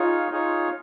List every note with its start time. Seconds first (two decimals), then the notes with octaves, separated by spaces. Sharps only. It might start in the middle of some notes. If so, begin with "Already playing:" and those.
Already playing: D#4 F4 G#4 C#5
0.31 D#4 F4 G#4 C#5